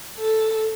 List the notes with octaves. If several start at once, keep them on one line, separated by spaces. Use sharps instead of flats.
A4